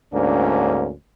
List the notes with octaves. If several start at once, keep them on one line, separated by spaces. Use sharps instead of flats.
D2 G#2 A#3 C#4 D4